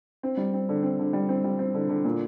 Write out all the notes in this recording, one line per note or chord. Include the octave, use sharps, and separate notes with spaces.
C4
G3
C4
D3
C4
D3
G3
C4
G3
C4
D3
D3
A#2